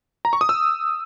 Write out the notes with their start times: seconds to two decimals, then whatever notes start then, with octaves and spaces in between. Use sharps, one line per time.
0.25 A#5
0.33 C#6
0.41 D#6
0.49 E6